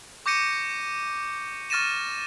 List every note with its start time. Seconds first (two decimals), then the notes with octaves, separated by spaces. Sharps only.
0.26 C#6 D6 G6 A#6 C#7 D#7
1.70 C#6 F6 A6 A#6 D#7 E7